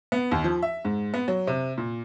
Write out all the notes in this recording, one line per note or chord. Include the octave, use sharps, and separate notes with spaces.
B3
D#2
F3
E5
G#2
B3
F#3
C3
A#2